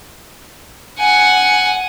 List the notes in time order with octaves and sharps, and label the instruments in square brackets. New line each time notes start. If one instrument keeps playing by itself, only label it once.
[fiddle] F#5 G#5